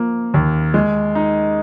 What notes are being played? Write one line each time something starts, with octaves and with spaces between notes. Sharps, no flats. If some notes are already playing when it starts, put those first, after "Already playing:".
Already playing: F3 A#3
D#2
G#3
D#4